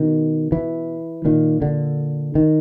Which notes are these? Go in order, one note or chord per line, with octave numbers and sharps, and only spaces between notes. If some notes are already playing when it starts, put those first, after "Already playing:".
Already playing: B2 D#3
E3
A#2 D#3
D3
D#3